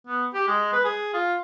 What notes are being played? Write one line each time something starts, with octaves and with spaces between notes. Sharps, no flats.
B3
G4
G#3
B4
G#4
F4